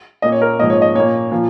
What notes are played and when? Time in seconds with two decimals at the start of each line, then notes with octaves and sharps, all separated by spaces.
0.22 A#2 A#3 D#5
0.32 C#5
0.42 A#4
0.59 G#2 F3 A#3 D#5
0.70 C#5
0.82 D#5
0.95 A#2 A#3 C#5
1.32 A#2 F3